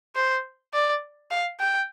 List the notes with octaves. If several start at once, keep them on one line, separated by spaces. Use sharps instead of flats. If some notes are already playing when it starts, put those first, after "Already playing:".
C5
D5
F5
G5